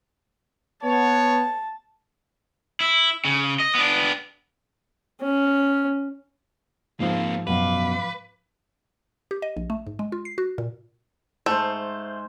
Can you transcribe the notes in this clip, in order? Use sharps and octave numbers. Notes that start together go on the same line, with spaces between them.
B3 C#5 A5
E4
C#3
D#5
B3 D4
C#4
G#2 F3 A#3 C4 F5
F#2 B2 B4 F5 D6
G4
D#5
A#1
A3
G#2
G#3
F4
C7
F#4
A#2
G#2 A3 C5